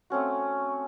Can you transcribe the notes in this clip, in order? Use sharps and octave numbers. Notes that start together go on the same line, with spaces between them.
A3 C4 C#4 F#4